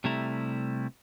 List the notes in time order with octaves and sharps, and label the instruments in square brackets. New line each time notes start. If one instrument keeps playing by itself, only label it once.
[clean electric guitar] C3 G3 A3 E4 A#5